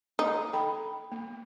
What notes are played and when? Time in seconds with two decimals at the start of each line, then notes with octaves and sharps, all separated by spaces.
0.19 A#3 D#4
0.53 A4 G5 B5
1.12 A#3